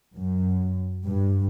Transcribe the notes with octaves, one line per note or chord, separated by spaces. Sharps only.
F#2
G2